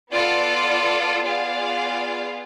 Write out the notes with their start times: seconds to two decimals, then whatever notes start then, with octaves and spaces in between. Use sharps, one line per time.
0.12 B3 F4 A4 D5
1.23 B3 F4 G#4 D5 F5